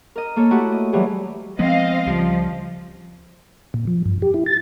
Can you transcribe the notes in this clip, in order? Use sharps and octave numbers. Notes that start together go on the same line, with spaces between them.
A#4 D#5
A#3 A4 C#5
A3 E4 F#4 G4
D#5
E3 F#3 G3 G4 G#4
F3 G#3 B3 C4 D#5 F5
C#2 F3 G3
A#2
F3
G2
G4
E4
A6